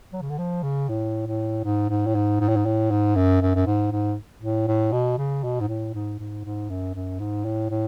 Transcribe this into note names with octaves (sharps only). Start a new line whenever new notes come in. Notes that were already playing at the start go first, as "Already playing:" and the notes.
F#3
C#3
D3
F3
C#3
A2
A2
G#2
G#2
A2
G#2
G#2
A2
G#2
A2
G#2
F#2
F#2
F#2
G#2
G#2
A2
A2
B2
C#3
B2
G#2
A2
G#2
G#2
G#2
F#2
F#2
G#2
A2
A2